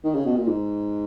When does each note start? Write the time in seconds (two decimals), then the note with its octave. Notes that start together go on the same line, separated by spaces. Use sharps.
0.04 D#3
0.15 C#3
0.26 B2
0.37 A#2
0.48 G#2